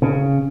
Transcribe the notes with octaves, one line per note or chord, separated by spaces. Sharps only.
C#3